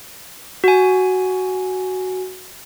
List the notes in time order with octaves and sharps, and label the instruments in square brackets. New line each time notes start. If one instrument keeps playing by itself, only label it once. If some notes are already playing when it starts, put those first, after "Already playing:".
[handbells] F#4 G#5